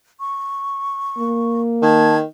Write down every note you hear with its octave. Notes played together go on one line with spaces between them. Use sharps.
C#6
A#3
D#3 A5 G#6